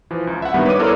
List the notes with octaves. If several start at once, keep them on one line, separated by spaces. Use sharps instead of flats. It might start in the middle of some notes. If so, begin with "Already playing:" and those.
E3 F3
C#2
E5 F#5
G2 D#3 G3 B3
B4 C#5 D6 D#7
E4 A4 A#4 C#5 D5 C6